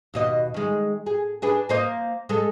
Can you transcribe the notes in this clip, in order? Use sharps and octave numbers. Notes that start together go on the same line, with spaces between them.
D#2 B2 D#5
D#3 G#3
G#4
D4 G#4 B4
A#3 C5 D#5
G#3 A4